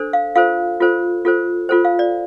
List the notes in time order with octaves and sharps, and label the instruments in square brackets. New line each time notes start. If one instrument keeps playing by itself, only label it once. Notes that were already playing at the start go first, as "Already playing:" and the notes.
Already playing: [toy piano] D4 A4 C5
F5
F4 A4 C5 F5
F4 A4 C5
F4 A4 C5
F4 A4 C5
F5
D5